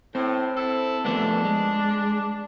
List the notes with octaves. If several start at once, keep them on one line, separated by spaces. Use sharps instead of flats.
A2 C4
E4 A4
F3 A3 B3 D4
G#3